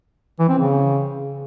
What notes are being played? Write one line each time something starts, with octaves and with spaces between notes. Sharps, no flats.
E3
C4
C#3